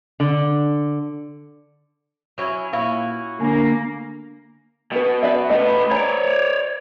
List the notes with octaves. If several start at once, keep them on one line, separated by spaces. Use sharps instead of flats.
D3
F#3 C#4 E4
A#2 C#4 E4 F#4 F5
D3 A#3 D4 G#5
B2 B3 B4
B4 D5 E5
A3 B4 D#5
C#5 D5 A#5